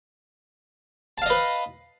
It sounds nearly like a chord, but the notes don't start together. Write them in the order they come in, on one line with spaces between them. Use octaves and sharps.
A5 F5 D#5 B4